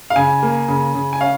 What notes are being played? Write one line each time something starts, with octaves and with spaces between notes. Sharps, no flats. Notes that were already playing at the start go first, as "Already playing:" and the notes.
F5
C#3 G#5
A#3
C#3
C#3
G#5
C#4 F5